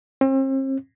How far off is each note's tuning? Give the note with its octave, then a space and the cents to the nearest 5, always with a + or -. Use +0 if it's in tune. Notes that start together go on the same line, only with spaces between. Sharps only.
C4 +40